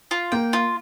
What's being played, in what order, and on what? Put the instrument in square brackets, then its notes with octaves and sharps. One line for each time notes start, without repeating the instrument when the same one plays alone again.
[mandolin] F4
[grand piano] A#3 [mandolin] G5
[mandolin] F4